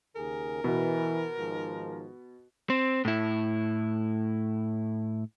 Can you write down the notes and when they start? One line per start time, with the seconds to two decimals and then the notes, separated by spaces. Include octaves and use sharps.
0.16 D#2 C#3 G#4 A#4
0.64 B2 E3
1.38 G#2 D#3 F3
2.70 C4
3.05 A2 E4